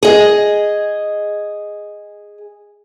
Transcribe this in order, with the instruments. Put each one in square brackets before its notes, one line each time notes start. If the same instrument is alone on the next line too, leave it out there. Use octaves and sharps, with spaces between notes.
[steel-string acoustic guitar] G#4 D#5